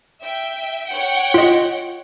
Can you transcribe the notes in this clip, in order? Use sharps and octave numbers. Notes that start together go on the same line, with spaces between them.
E5 G5
C#5 F#5 G5
F4 D#5